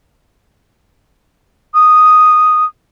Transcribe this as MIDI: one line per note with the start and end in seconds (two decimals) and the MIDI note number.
1.74 2.65 87